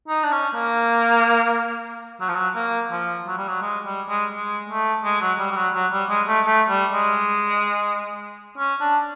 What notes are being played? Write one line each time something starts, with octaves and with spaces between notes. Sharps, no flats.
D#4
D4
C#4
A#3
F#3
F3
F#3
A#3
F3
F#3
G3
F#3
G#3
G3
G#3
G#3
A3
G#3
F#3
G3
G3
F#3
F#3
G3
G#3
A3
A3
G3
G#3
C#4
D4